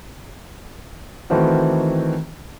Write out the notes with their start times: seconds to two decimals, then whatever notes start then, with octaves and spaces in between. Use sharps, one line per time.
1.30 D#3 E3 A3 C4 F#4